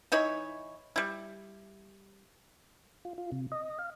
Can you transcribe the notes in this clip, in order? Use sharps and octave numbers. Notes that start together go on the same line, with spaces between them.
E3 D#4 E4 C#5
G3 E4
F4
F4
C3
D#5
F5